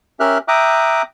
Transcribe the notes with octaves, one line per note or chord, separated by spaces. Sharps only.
C#4 G4 A#4 E5 F6 F#6
E5 G5 A#5 D6 D#6 F#6